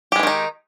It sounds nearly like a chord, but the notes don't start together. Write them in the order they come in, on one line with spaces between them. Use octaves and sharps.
G4 G#3 E3 D#3 D#4